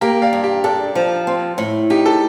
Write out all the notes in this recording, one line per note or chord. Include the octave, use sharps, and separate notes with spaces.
A#3 G4 A#4
D5 F5
G2
G4
D4 A4
F3
C4
A2
D#4 G4
A4